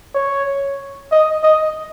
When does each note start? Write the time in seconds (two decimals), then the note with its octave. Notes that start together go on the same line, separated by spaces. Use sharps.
0.15 C#5
1.11 D#5
1.43 D#5